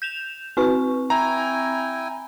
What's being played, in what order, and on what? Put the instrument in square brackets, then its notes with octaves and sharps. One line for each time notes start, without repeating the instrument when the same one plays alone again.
[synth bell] G6 E7 F7
[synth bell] C4 C#6 [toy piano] F#4 B4
[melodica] E4 G5 G#5 [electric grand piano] A#5